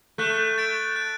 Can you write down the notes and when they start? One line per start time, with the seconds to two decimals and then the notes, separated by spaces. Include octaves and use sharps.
0.18 A3 F#6
0.58 A6 D7
0.96 F#6